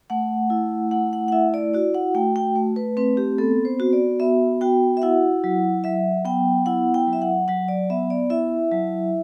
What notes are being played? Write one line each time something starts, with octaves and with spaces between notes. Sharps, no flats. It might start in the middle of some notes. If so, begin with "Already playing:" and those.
A3 F#5
E4
A3 F#5
F#5
F#5
E4 E5
D5
F#4 D5
F#5
A3 G5
G5
A3
B4
C4 B4
G4
B3 A4
C5
F#4
D5
B3 E5
F#4 G5
E5
E4 F#5
F#3
F#3 E5
B3 G5
E4 F#5
G5
F#3
E5
F#5
F#3 F#5
D5
B3 E5
D5
E4 E5
F#3